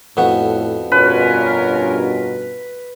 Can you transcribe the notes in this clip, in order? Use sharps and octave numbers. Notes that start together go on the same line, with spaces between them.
F2 A2 B3 F#4
G2 B2 C#4 F4 A#4 B4